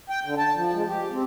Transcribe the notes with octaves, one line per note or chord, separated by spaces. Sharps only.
G5
D3
A5
F3
G#3
G4
C4